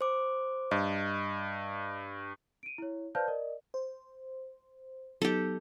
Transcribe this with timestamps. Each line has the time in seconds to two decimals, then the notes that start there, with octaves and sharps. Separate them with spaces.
0.01 C5 D6
0.71 G2 D#5
2.63 D7 D#7
2.78 E4 C#5
3.15 B4 C5 D5 F5 A5 G6
3.28 A#4 D5 D#5
3.74 C5
5.22 F#3 B3 D#4 G4 A4